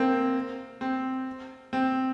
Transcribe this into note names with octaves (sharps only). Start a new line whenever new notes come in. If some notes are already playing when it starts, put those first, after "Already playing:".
Already playing: A#3 C4
C4
C4